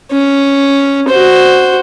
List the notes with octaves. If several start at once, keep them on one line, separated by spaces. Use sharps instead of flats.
C#4
F#4 C5